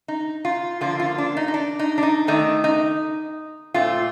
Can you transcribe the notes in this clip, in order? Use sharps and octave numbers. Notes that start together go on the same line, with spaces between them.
D#4
F4
D3 F3 A#3 D4 F4
F4
D4
D#4
D#4
D4
D#4
D4
D#4
D#3 A3 D4 D#4
D#4
A#2 A3 C4 F4